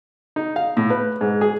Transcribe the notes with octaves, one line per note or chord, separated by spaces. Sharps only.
D#4
F5
A2
B4
G#2
G#4